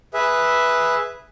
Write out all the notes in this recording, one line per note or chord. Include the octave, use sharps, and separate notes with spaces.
G#4 B4 E5